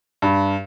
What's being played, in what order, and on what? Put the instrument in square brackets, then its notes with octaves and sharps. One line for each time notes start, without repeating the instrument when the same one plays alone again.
[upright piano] G2